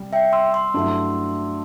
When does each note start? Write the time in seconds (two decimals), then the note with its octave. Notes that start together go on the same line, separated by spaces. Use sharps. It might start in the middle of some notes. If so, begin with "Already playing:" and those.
Already playing: C3 G3
0.13 E5 G5
0.33 C6 E6
0.54 C6 E6
0.74 G2 F#3 A3 E4